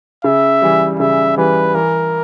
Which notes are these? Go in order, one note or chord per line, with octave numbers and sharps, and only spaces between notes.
C#3 E5
E3 G3
C#3 E5
E3 G3 B4
E3 A#4